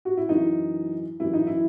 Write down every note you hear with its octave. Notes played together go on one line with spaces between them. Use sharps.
F#4
E4
F#2 E3 D#4
F#2 E3 E4
D#4
E4